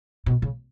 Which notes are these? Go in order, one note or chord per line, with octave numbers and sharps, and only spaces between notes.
B2
C#3